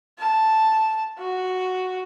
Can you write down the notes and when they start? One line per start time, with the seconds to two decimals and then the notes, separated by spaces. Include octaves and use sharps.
0.18 A5
1.18 F#4